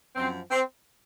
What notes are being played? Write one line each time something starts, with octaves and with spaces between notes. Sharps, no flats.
F#2 F3 C4
C4